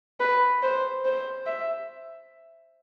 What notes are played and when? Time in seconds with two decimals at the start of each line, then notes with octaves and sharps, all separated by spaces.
0.20 B4
0.62 C5
1.05 C5
1.46 E5